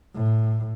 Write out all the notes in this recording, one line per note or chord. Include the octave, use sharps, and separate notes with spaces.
A2